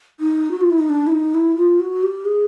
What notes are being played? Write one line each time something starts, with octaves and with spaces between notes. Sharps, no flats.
D#4
F#4
F4
E4
D#4
D4
E4
D#4
E4
F4
F#4
G4
G#4